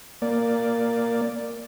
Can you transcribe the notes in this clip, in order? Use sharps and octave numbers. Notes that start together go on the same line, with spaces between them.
A#3 D5